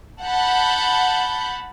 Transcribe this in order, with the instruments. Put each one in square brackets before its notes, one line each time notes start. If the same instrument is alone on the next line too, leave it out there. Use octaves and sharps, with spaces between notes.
[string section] F#5 A5 B5 G6